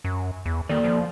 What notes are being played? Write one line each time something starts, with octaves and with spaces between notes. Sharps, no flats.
F#2
E2
D#3 A#3 A4 D5
F3